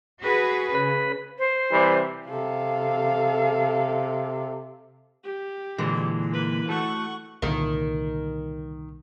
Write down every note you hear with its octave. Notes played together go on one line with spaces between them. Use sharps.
F#4 G#4 B4
C#3 B4
C5
C3 E3 G3
C3 A4 F5
G4
A#2 D3 E3 G#3
A#3 B4
A3 F#4 A4 F#5 C#6
C2 A#2 D3 D#3